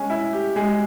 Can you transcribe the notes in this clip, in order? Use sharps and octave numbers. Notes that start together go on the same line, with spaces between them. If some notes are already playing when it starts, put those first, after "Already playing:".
Already playing: G#3 C#4
E4
G4
G#3